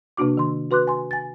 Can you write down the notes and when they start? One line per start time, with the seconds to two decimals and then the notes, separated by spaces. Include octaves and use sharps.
0.17 C3 A#3 D4 F#4 D6
0.37 D#3 C6
0.71 F#4 B4 C6 D6 F#6
0.87 G#5 C6
1.11 G#5 A6